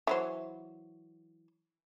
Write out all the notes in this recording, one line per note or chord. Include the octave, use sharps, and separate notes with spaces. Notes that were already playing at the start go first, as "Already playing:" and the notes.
E3 F#3 C5